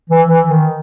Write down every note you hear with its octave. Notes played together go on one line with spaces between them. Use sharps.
E3
E3
D#3